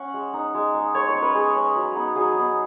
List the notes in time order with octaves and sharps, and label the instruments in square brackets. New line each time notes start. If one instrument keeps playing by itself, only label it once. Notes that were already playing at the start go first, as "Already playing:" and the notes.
Already playing: [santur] C#4 F#5
G#3
D#4
G#3
D#4
G#3 C#5
C#5
C#4
B4
G#3 G#4
C#4
F#3
B3 D#4
F#3 G#4
B3 D#4